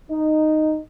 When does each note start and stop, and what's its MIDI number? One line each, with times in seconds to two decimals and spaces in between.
0.10 0.78 63